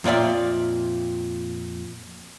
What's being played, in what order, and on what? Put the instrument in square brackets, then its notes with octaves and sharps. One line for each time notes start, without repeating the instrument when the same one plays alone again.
[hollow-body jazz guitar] F2 A#2 F4 D5 E5